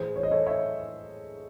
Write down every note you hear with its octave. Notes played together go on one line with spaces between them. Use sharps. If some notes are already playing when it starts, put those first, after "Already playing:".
Already playing: A2 E3 G#4 C5
C#5
D#5
A4 C#5
C#5 E5